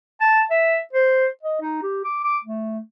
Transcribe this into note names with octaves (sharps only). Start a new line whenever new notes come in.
A5
E5
C5
D#5
D#4
G4
D6
D6
A3